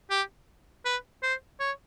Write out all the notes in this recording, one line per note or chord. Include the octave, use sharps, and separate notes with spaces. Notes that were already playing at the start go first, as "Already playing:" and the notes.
G4
B4
C5
C#5